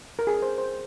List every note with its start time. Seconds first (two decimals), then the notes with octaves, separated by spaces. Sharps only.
0.19 A#4
0.27 G#4
0.42 C5
0.58 C5